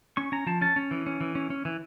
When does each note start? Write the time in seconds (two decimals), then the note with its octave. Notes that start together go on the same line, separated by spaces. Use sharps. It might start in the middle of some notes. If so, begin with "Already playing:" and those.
0.17 C#4 C#6
0.32 C#4 A#5
0.47 F3 A5
0.61 C#4 A5
0.76 C#4
0.91 E3
1.06 C#4
1.21 E3
1.35 C#4
1.50 C#4
1.65 E3